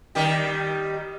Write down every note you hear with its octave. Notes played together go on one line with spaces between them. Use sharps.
D#3 G3 G4